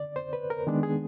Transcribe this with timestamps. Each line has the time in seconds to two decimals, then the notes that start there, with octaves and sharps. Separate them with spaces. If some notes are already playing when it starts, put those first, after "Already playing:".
Already playing: D3 D5
0.16 C5
0.33 B4
0.50 A#4
0.67 D#3 G#3 B3 D4
0.83 G#4